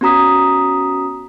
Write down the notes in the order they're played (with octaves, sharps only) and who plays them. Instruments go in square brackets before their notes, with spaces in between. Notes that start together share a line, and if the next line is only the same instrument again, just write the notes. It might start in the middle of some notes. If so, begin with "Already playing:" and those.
[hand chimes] B3 C#4 F#4 A#5 D#6 B6